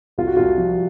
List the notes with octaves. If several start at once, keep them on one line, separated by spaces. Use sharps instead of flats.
C2 F4
F#4
C2 F4
F3